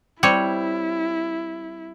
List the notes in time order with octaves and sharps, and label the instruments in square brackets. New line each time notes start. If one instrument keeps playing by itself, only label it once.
[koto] G3 C4 C#5 [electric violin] E4